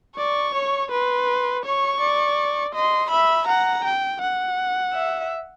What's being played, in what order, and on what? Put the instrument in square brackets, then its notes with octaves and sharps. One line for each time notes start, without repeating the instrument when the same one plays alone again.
[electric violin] D5 [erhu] C#6
[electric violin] C#5
[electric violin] B4 [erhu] C6
[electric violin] C#5 [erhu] C#6
[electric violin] D5
[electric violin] D#5 [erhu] C6
[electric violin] E5 [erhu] B5
[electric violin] F#5 [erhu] A#5
[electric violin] G5
F#5
[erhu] E5